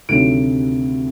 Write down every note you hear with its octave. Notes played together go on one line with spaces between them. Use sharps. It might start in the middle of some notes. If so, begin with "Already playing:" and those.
D2 C3 D#3 F#3 D7